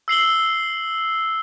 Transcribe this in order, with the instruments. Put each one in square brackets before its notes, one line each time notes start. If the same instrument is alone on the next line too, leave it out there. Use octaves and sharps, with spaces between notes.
[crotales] E6 C7 F#7 G7